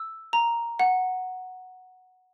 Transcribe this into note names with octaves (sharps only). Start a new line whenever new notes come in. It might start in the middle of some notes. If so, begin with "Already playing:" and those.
Already playing: E6
A#5
F#5